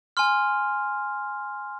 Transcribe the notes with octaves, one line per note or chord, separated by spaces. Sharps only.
G#5 C6 F6